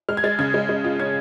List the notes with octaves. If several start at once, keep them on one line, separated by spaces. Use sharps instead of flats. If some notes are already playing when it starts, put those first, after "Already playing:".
G#3 F6
G#6
G#3 A6
C#3 G#6
G#3
G#3
F4
C#4 G#6